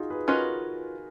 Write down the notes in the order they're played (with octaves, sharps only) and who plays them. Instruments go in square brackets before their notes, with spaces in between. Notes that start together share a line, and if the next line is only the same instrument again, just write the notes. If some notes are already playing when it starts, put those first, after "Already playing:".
Already playing: [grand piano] D#4 F4 F#4 G#4
G#4 B4
[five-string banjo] C#4 F4 B4 D#5 [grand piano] F#4 A#4